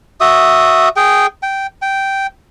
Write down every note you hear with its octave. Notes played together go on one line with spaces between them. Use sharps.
F#4 E5 D#6
G#4 G5
G5
G5